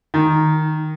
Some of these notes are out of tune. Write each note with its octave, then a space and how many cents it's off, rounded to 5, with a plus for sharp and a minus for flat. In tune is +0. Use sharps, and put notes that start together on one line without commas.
D#3 +0